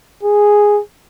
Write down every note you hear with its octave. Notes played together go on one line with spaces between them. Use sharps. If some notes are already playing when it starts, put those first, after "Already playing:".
G#4